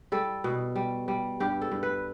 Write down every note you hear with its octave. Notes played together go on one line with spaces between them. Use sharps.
G3 A4
B2
G3
G3
G2 G4
A4
G2
B4